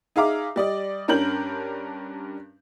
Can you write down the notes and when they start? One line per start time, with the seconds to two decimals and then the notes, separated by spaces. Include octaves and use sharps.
0.16 D#4 G#4 E5 F5 A#5 D6
0.56 G3 D5 D#5
1.08 G2 C#4 D4 A#4 G6 F#7